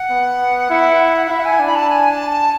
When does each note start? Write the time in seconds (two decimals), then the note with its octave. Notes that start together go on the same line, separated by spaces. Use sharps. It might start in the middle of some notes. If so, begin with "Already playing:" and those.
Already playing: F#5
0.10 B3
0.70 E4
1.26 F#5
1.30 E4 E5
1.40 F#5
1.45 G#5
1.60 D4
1.67 B5
1.75 A5
1.90 G#5
2.10 A5
2.30 A5